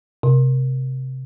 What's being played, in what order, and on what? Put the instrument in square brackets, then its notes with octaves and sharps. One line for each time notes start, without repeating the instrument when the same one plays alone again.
[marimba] C3